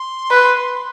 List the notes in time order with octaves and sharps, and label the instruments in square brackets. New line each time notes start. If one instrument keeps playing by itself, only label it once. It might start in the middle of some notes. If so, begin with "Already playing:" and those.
Already playing: [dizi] C6
[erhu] B4